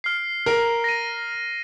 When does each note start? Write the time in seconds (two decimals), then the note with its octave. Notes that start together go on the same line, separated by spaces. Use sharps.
0.04 F6 C7
0.46 A#4
0.84 A#6 D#7